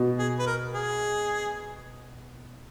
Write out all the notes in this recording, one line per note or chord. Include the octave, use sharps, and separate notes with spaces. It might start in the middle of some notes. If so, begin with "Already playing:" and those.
Already playing: B2
G#4
B4
A#4
G#4